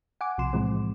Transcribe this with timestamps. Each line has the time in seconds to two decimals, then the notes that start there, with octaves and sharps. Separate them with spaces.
0.21 F#5 G#5 D6
0.38 B1 C3 F3 C6 E7
0.53 A2 E3 F3 G#3 C4